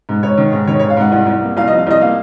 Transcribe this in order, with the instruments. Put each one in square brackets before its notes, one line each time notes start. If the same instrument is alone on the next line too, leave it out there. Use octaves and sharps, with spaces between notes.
[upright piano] G#2
G#2 C#5
D#3
G#2
D#3 C#5
C#5
G#2
F5
G#2 F#5
C2 F#5
C2
A#3
C2 F5
D#5
F3
F5
C2 D#5
A#3 F5